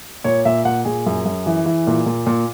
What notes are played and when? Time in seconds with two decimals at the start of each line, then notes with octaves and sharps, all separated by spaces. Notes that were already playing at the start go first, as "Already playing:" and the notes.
0.24 A#2 C#5
0.45 A#2 E5
0.65 A#2 F#5
0.85 A#2 G#4
1.06 F#2
1.25 F#2
1.46 E3
1.66 E3
1.87 A#2
2.06 A#2
2.26 A#2